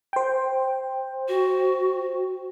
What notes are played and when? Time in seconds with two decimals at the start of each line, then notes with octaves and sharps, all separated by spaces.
0.13 C5 G5
1.29 F#4